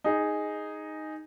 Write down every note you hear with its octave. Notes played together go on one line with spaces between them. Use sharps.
D#4 G#4